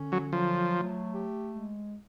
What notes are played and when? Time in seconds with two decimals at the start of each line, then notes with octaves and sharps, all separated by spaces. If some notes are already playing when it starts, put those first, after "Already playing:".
Already playing: D3 C#4
0.12 F#3
0.32 F3 F#3
0.73 A3
1.13 G4
1.53 G#3